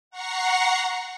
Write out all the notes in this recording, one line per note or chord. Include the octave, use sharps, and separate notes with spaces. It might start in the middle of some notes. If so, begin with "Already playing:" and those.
F#5 A#5 C#6 A#6 C7